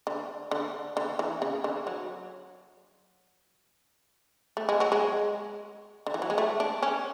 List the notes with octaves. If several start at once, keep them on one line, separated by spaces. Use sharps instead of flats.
D3
D3
D3
E3
C#3
D3
F#3
A3
G#3
F#3
G#3
D3
E3
F#3
G#3
A3
D4
C#4